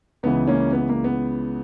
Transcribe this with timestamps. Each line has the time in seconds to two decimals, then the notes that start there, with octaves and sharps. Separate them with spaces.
0.23 C#2 C#3 E3 B3
0.47 A#3 C#4
0.72 B3
0.89 A#3
1.04 B3